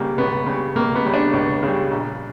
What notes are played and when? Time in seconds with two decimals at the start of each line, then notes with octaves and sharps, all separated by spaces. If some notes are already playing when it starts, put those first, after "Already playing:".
Already playing: C#2 C#3 G3 A#3
0.18 C#2 B3
0.46 C#3 G3
0.75 C#2 A#3
0.95 B3
1.05 C#3 G3
1.14 D4
1.33 C#2
1.63 C#3 G3
1.91 A#1